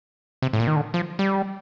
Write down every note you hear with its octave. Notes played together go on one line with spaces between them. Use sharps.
C3
A2
A#2
D#3
D3
F3
G3